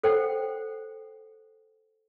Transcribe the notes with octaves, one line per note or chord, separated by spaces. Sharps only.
A4 C5 F#5 G5